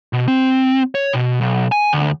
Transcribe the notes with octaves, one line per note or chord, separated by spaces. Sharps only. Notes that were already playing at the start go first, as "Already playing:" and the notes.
B2
C4
C#5
B2
B1
G#5
D2